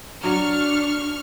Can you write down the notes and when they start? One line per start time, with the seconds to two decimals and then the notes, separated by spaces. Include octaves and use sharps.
0.23 F#3 D4 F#4 C#6 F6